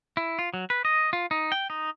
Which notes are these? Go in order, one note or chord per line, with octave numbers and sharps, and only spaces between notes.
E4
F4
F#3
B4
D#5
F4
D#4
G5
D#4